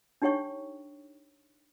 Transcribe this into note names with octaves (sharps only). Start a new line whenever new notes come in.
D4 D#4 G4 C#5 G5 C#6